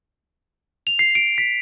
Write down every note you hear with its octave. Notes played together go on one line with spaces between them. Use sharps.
F7
C7
D7
B6